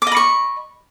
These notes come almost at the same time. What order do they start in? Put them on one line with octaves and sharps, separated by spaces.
D6 D#5 B5 C#6